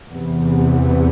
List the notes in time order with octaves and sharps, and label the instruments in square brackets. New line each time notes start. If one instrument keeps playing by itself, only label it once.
[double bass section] E2 C3 E3 B3